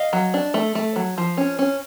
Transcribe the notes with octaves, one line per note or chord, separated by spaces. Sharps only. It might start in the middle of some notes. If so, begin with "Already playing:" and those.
Already playing: D#5 F5
F#3
D4
A3
A3
F#3
F3
C#4
C#4